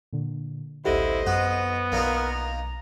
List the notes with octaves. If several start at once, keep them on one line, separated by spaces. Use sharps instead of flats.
A#2 D3
A1 D2 D3 E4 G4 C5 D#5
F#2 B3 F#4
B1 A#3 D#4 F4 A#4 D5
A#5